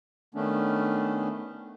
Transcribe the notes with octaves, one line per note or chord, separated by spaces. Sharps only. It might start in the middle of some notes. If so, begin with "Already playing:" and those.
D#3 A3 B3 C#4 D4